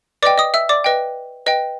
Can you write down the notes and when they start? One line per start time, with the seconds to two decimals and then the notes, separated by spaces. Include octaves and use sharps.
0.23 B4 D5 D#5 G5 D6
0.38 D#5 D#6
0.54 E5 E6
0.69 D5 D6
0.84 B4 D#5 G5
1.46 B4 D#5 G5